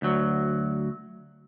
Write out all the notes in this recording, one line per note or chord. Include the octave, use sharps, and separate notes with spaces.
D2 F#3